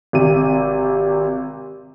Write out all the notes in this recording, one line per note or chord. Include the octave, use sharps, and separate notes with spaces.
G#1 C3 D#7